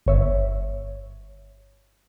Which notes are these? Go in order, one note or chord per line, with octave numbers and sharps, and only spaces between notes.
G1 C#5 E5